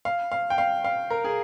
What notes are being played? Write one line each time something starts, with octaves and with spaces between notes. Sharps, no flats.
F5
F5
G5
F5
F5
A#4
G#4